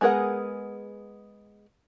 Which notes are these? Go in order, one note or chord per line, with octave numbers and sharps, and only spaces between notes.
G#3 B3 G#4 A#4 F#5